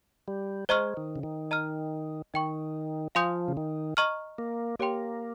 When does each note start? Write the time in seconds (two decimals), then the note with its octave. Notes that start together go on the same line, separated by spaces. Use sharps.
0.28 G3
0.69 G#3 C5 D#5 A#5 C#6 F6
0.97 D#3
1.16 C#3
1.23 D#3
1.51 D#5 A#5 F6
2.34 D#3 D#5 G5 C#6
3.15 F3 F5 G#5 C6 D#6 G6
3.48 C#3
3.57 D#3
3.97 D#5 A#5 C#6 F6
4.38 A#3
4.79 A#3 G4 C#5 G5 C6